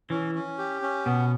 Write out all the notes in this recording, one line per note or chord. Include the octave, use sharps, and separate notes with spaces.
E3 C#4
C#4
G4
C#4
B2 B3